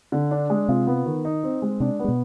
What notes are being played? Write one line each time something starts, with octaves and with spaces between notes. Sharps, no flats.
D3
D4
G#3
C3 C4 F4
B3
D#3
D#4
C4
G#3
C3 C4 D4
G#3 B3
B2